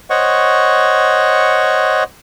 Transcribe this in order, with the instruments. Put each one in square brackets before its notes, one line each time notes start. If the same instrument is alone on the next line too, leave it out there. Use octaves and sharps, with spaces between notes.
[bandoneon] C5 C#5 D#5 F#5 C#6